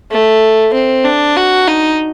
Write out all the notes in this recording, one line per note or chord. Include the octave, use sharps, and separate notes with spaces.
A3
C4
D4
F#4
D#4